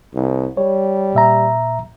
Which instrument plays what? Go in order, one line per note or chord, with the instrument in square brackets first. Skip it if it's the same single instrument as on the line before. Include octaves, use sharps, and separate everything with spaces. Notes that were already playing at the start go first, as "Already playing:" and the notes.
[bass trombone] C2
[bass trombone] G3 [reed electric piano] C#5
[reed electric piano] A#2 E5 A#5